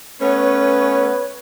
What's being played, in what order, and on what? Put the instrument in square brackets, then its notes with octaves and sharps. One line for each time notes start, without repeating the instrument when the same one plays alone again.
[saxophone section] A3 B3 C#4 [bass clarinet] B4 [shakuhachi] C#5